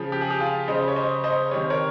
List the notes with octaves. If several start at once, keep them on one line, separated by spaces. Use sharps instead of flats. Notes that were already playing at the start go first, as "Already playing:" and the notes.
Already playing: C#3 F3
G4
G#4
G4
F4 G#4
C#3 G3 C5 D#5
C#5
C5 D#5
C5 D#5
C3 D#3 G3 C#5
C5
A#4 C#5